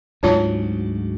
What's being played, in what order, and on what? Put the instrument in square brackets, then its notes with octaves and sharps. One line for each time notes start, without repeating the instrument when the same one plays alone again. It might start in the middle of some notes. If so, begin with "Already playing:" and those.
[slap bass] D2 G#2 F#3 [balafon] F4 C#5 A5